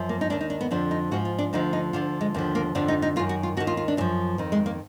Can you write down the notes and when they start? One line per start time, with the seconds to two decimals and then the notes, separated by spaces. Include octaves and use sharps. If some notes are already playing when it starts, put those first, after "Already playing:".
Already playing: F#2 F3
0.09 A#3
0.21 D#4
0.30 D#2 D#3 D4
0.41 D#4
0.50 D4
0.61 B3
0.71 F2 D3 F3 D4
0.91 D#4
1.11 G#2 F3 F#4
1.25 F4
1.38 D4
1.53 D2 D3 F3 D#4
1.73 D#4
1.93 D2 D3 F3 F4
2.21 G#3
2.34 D#2 D3 F3
2.55 A#3
2.75 F2 D3 F3 D4
2.88 D#4
3.02 D#4
3.16 D#3 F4
3.19 F#2
3.29 F#4
3.43 F4
3.57 D#2 F#4
3.60 D#3
3.67 F4
3.77 F4
3.88 D4
3.97 F#2 F#3
4.01 F3
4.38 F2 D#3
4.52 G#3
4.66 A#3